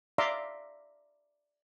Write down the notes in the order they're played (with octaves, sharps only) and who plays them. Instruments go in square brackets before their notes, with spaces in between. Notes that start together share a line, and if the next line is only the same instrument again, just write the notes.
[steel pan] D5 E5 F5 A#5 C6 D6